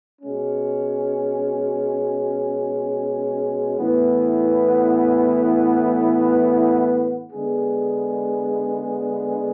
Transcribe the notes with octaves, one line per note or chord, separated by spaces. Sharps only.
B2 G#3 C#4
A2 E3 B3
D3 G#3 B3 D4 G#4